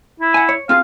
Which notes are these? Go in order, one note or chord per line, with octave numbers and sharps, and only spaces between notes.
E4
F#5 G#5
C#5
C4 F4 G#4 F5